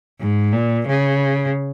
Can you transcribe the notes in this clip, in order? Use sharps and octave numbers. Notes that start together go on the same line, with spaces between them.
G#2
A#2
C#3